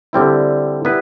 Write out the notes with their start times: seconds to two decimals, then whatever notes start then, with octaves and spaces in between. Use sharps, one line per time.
0.13 D3 G3 C4 E4
0.85 G3 B3 E4 G4 B4